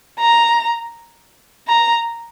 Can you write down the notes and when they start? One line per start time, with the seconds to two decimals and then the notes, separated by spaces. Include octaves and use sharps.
0.19 A#5
1.68 A#5